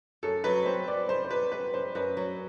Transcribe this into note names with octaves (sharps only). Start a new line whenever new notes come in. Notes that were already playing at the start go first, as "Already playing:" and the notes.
F#2 A4
F#3 B4
C4 C5
F#2 D5
F#2 C5
C5
F#3 B4
C4 B4
F#2 C5
F#2 B4
F#3